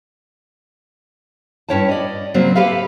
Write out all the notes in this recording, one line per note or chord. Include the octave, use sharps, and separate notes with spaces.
G2 C#4 E4 C#5 G5 A5
D5 D#5
C#3 F#3 A#3 C4
G4 A4 B4 E5 F5